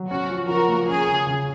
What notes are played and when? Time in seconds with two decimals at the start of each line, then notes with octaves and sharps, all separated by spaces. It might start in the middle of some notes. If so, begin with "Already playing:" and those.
Already playing: F#3
0.11 C#4 F#4
0.30 F3
0.49 F3 F#4 A#4
0.68 A#3
0.88 C#4 G#4
1.07 C#3
1.27 C#3